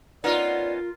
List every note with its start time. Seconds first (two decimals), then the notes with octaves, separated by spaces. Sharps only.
0.24 B3 C#4 D#4 F4 A#4 D5